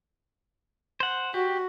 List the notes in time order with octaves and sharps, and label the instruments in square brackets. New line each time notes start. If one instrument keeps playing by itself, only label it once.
[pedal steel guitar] C5 F#5
[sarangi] F#4 [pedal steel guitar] G4